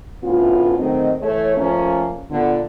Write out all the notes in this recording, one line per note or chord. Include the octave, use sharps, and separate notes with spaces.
D2 A2 B3 C#4 F4
D#3 F#3 A3 C4 D#5
E3 A3 A4 C#5
F3 A3 A#3 C#4
A#2 D3 B3